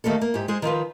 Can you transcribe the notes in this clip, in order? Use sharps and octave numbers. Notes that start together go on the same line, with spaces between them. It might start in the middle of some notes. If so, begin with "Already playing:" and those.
D#3 A3 A#3 G4 A4
A#3
G#2 G4
G#3 G#4 C5
D#3 F3 F4 B4